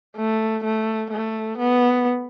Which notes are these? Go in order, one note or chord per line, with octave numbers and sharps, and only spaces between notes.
A3
A3
A3
B3